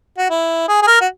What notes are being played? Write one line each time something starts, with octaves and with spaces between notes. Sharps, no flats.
F#4
E4
G#4
G#4
A#4
F#4